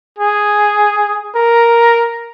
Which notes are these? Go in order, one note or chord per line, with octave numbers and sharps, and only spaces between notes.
G#4
A#4